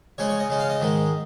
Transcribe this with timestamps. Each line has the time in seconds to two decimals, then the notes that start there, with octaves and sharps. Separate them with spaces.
0.18 C#3 G#3 C#4 C#5
0.29 C#5
0.39 D#5
0.50 C#3 G#3 C#4
0.59 F5
0.70 D#5
0.80 G#2 D#3 G#3